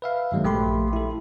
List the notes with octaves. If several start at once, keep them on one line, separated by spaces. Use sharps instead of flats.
B4 E5 F5
G2 D#3 F#3 G#3 A#3
A#1 A3 G4 B5 C6
E4 A4